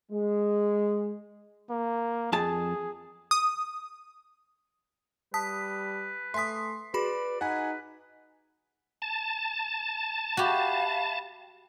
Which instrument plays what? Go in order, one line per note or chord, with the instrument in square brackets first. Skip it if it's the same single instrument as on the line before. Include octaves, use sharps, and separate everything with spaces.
[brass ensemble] G#3
[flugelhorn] A#3
[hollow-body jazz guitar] F2 A5 [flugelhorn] G#4
[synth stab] D#6
[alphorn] G3 [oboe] B4 [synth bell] A5 D#6 B6
[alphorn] A3 [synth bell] E5 G#5 D#6 [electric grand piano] C6 B6
[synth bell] F#4 G#4 B5 [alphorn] B4 [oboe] D5
[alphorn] D#4 [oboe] B4 [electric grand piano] F#5 G#5
[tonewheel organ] A5
[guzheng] F#4 G4 [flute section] E5 F5 B5